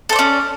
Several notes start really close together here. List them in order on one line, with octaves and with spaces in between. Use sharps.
A4 C5 D5 C#4